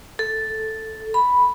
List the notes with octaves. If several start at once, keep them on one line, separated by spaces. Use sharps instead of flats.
A4
B5